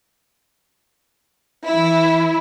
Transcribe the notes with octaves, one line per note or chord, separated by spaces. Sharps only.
E3 E4